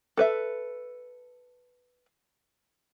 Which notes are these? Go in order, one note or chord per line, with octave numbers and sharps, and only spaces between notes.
A4 B4 E5